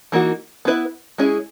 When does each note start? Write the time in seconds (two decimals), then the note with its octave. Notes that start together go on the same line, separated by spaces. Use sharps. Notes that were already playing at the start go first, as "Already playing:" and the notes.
0.12 E3 A#3 D#4 F#4
0.65 B3 E4 B4 E5
1.18 G#3 C#4 E4 G#4